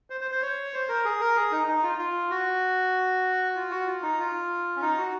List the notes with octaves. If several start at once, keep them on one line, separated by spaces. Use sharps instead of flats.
C5
C5
C5
C#5
C5
A#4
G#4
A#4
G#4
D#4
D#4
F4
F4
F#4
F4
F#4
F4
D#4
F4
C#4
D#4
F#4